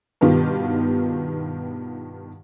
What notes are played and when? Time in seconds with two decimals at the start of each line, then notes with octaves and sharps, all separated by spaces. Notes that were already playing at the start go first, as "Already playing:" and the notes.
0.21 G2 B2 D#3 B3 F4 G4